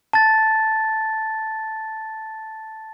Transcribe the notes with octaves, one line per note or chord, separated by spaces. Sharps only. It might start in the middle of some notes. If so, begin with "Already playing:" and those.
A5 A6